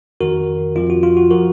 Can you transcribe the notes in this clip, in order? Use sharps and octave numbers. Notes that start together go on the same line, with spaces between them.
F2 D#3 F#4 A#4
F2 F3 F4
F#4
F4
F#4
F3 F#4 A#4